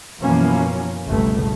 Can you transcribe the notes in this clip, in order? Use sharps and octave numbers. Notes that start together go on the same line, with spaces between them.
F#2 B2 E3 F3 A#3 C#4
G1 C#2 B2 A3